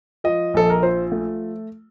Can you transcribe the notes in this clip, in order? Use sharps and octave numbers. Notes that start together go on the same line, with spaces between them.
F3 D#5
A#1 A4
A#4
F3 C5
A3